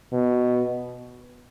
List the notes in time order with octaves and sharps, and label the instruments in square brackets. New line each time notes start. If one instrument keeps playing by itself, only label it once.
[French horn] B2